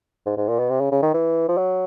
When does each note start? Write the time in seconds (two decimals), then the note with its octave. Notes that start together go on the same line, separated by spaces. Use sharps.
0.26 G#2
0.37 G#2
0.48 A#2
0.59 B2
0.70 C3
0.81 C#3
0.92 C#3
1.02 D#3
1.14 E3
1.48 F3
1.57 F#3